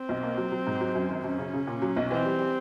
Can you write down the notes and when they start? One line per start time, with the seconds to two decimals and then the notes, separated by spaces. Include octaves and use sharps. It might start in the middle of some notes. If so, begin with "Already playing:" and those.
Already playing: C4
0.09 B1
0.23 A#3
0.37 F#3
0.52 F#3
0.67 G#2
0.81 F#3
0.95 F#2
1.09 G#1
1.24 F#2 C#4
1.38 C#3
1.53 C#3
1.67 A#2
1.82 F#3
1.96 B1
2.11 E3 C4
2.25 G3
2.39 G3